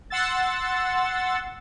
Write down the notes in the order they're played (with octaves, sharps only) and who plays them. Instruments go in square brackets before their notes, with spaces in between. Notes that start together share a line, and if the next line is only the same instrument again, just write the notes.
[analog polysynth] F#5 C6 E6 A6